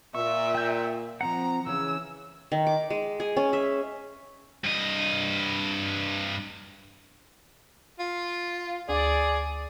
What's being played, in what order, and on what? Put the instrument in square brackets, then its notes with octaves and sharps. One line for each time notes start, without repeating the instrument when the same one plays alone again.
[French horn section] A#2 [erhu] E5 [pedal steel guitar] C#6
[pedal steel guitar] G5 G6
[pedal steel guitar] F3 C4 F#5 [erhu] A#5
[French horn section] C#3 [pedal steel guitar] E3 C#4 [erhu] E6
[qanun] D#3
D6
G#3
G#4
C#4
E5
[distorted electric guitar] G2 D#5
[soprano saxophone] F4
[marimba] D2 [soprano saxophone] G#4 [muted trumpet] D5